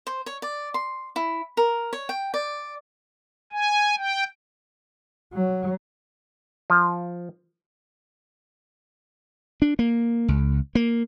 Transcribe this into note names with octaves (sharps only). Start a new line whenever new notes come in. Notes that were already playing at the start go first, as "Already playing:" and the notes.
C5
C#5
D5
C6
E4
A#4
C#5
G5
D5
G#5
G5
F#3
F3
D4
A#3
C#2
A#3